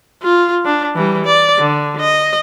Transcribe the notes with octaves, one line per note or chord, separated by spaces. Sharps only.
F4
D4
E3 G3
D5
D3
D#5